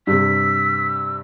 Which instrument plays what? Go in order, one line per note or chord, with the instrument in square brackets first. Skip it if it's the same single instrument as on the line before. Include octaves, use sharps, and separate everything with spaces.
[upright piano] G2 C3 [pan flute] E6 [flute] B6